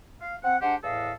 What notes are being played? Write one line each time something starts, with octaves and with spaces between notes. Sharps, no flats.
F5
C4 F#5
G#3 D4 G4 C5 F#5
E2 A2 A4 D#5 F5